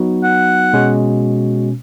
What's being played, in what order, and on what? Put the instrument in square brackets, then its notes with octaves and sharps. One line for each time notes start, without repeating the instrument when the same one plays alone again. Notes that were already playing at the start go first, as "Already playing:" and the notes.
Already playing: [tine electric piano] F#3 B3 D#4 F#4
[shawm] F#5
[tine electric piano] B2 G#3 C#4 F#4